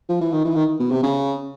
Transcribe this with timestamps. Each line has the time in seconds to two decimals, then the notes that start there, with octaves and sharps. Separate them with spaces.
0.09 F3
0.21 E3
0.33 D#3
0.45 E3
0.56 D#3
0.80 B2
0.91 C3
1.03 C#3